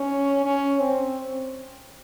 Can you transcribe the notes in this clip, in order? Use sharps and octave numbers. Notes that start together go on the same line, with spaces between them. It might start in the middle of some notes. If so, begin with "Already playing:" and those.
Already playing: C#4
C#4
C4